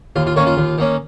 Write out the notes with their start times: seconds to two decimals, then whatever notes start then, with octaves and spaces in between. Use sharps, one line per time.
0.16 D#2 F4
0.27 F4
0.36 D#3 A#3 C#4 A#4 C#5
0.47 F4
0.57 D#2
0.78 D#3 A#3 C#4